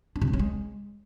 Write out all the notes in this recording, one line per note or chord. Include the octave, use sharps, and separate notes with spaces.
D4
C3
A3
C#4
G#3